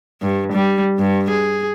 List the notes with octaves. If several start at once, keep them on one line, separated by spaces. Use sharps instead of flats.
G2
G3
G2
G#4